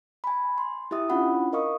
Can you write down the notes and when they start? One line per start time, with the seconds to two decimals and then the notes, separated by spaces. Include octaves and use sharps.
0.24 G#5 B5
0.58 C6
0.91 E4 G4 E5 D#6
1.09 C#4 D4 E4 F4 F#5 B5
1.53 A#4 D#5 F5 C#6 D#6